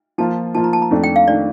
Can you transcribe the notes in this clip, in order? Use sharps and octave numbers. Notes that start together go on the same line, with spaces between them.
F3 A#3 F4 A5
F3 A#3 F4 A5
A#5
A5
A#5
F2 D#3 A3 D4
G5
F5
D#3 A3 D4 D5